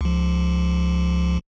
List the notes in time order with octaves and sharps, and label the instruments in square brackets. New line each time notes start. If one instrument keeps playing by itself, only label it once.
[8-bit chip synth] C#2 F3